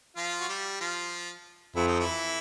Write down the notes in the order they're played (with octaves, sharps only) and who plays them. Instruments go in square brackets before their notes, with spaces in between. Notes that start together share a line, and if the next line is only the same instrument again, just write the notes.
[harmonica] F3 F4
F#4
G3 G4
F3 F4
[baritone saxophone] F2 [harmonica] E4
[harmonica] D#4
E3 E4